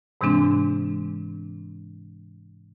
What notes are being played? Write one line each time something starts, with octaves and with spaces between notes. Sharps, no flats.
G#2 C3 E3 G#3 C4 D4